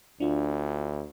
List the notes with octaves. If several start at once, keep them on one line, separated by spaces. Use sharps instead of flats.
D2 D4 F4